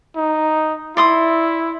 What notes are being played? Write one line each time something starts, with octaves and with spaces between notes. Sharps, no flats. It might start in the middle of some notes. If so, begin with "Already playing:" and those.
D#4
E4 D5 C6 D#6